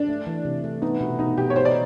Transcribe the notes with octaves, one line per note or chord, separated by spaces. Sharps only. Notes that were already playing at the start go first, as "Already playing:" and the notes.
Already playing: D4
A3
E3
C3
A3
B3 D#4
B2
B2 D#4
B2 G4
C#5
D#4 C5
D5